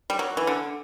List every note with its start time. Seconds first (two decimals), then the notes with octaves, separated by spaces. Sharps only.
0.10 G3
0.19 F#3
0.37 E3
0.47 D3